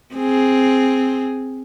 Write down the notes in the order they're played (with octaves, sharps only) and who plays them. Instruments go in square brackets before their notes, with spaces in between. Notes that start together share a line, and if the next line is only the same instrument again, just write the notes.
[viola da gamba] C4 G#4